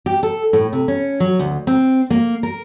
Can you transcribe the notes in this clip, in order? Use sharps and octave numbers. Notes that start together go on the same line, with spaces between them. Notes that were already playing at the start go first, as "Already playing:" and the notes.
G4
A4
A2
C3
C#4
F#3
D2
C4
A#3
A#4